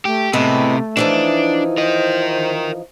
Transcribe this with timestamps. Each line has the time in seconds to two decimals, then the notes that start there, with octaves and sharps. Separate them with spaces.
0.05 A3 G4
0.33 A2 C3 G#3 A3 B3
0.97 E3 F3 D4 D#4
1.78 A#4 C5 D#5